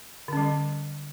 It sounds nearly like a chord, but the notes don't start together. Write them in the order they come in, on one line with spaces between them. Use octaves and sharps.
D3 C#4 G3